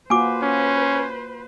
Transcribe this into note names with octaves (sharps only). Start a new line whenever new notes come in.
A#3 F4 F#4 B4 C5 G#5 D6
C#4